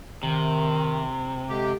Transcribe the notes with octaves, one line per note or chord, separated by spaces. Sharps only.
C3 D#3
D3 G#3 G4